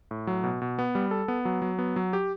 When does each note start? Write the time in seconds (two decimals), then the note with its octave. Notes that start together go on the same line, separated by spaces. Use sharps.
0.11 A2
0.27 F#3
0.44 B2
0.62 B2
0.79 B3
0.95 G3
1.11 A4
1.28 B3
1.45 F#3
1.62 F#3
1.79 B3
1.96 F#3
2.13 G4